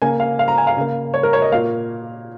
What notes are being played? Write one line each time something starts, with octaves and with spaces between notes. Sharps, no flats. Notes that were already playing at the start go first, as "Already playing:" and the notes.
C#3 A#3 G#5
F5
F5
A#5
G#5
F5
C#3 A#3
C#5
A#4
C#5
D#5
A#2 A#3 F5